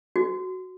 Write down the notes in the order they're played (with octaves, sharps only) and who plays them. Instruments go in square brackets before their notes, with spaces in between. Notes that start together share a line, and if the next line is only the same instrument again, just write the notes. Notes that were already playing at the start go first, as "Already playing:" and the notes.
[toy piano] F#4